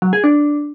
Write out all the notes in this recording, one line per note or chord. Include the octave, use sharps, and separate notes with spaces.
F#3
G#4
D4